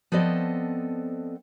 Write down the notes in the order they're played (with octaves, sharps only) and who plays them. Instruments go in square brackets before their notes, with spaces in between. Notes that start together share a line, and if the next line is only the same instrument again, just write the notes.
[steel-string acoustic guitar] F3 B3 C4 A4 D5 D#5